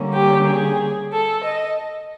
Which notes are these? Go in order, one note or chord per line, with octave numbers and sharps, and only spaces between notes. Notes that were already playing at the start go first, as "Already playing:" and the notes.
Already playing: D3 G3 A#3 C#4
G4
G#4
A4
D#5